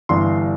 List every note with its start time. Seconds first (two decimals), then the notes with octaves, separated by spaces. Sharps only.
0.09 G1 G2 E3 G3 C6